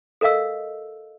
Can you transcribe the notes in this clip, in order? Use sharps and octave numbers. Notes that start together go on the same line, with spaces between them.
A4 A#4 D#5 F5 E6